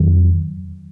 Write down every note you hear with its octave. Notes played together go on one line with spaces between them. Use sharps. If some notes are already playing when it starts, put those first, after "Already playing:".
Already playing: F2 D#3 F#3